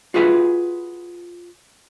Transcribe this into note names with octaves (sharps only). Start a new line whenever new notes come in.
F4 F#4 G#4 B4 E5 G#5